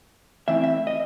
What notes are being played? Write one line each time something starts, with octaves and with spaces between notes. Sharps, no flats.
E3 A3 C4 E4 E5
E5
D#5